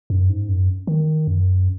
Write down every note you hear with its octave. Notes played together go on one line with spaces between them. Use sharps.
F#2
G#2
F#2
D#3
F#2